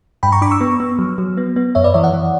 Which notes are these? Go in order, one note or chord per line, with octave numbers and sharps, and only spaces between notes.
G2 G5 B5
A#5 C#6
D4 B5 D6
C#6 E6
B3
B3
F#3
F#3
B3
B3
F#2 C#5 E5
B4 D5
E3 C#5 E5
D5 F#5
E3